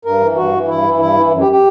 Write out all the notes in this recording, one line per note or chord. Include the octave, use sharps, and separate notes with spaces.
G2 A#4
E3
G2 F#4
E3
G2 E4
E3
G2 E4
E3
F#2
G4
G4